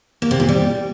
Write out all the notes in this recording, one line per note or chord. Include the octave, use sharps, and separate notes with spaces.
A#3
C3
A#2
G3